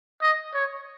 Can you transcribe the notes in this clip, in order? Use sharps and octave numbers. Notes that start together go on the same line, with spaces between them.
D#5
C#5